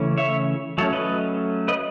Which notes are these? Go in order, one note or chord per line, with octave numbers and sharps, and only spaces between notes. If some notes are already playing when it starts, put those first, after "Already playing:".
Already playing: C#3 E3 A3 C#4
C#5 E5
F#3 A3 C#4 A4 C#5
B4 D#5
B4 D#5